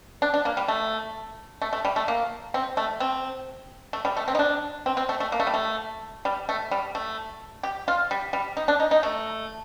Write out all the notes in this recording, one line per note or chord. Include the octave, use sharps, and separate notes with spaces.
D4
D4
A#3
G3
A3
A3
A3
G3
A3
A#3
C4
A3
C4
A3
G3
A3
C4
D#4
D4
C4
C4
A3
A3
A#3
A3
G3
A3
G3
A3
G3
A3
G4
F4
G3
G3
D#4
D4
D#4
D#4
A3